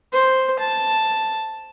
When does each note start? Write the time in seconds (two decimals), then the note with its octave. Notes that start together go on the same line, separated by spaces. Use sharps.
0.13 C5
0.59 A5